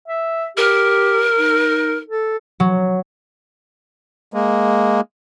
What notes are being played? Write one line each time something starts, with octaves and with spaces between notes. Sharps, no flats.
E5
G4 A#4
D#4
A4
F#3
G#3 A#3